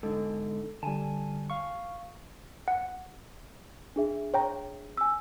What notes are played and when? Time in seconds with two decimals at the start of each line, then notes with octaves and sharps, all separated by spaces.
0.03 G#2 D3 A4
0.83 D3 G3 G#5 A5
1.50 F5 C#6
2.68 F#5
3.96 D4 G#4 E5
4.34 C#5 G5 A#5
4.97 G#5 E6